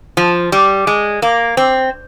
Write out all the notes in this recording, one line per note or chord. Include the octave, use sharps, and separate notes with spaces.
F3
G3
G#3
A#3
C4